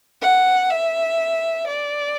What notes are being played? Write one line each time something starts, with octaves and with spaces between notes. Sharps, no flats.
F#5
E5
D5